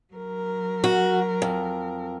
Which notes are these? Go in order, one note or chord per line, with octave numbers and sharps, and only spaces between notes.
F#3 A#4
F#4
F2